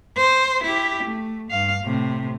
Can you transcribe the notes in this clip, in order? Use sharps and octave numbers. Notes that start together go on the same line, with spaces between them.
C5
E4 G4
A3
G2 F5
A2 C3